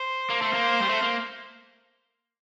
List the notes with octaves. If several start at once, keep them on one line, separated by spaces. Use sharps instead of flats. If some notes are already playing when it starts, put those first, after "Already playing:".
Already playing: C5
A#3
A3
A#3
G3
A3
A#3